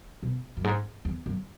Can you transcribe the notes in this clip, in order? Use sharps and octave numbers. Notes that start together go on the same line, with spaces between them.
B2
F#2
G#2
E2
F#2